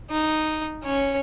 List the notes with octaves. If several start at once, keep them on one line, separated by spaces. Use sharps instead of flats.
D#4
C#4 C#5